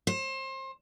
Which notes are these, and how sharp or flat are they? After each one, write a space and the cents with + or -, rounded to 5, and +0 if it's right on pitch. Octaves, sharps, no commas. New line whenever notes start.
C5 +30